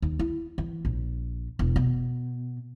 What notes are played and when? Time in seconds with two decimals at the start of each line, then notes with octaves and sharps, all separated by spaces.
0.02 D#2
0.19 E4
0.58 E3
0.85 A#1
1.59 E1
1.76 B2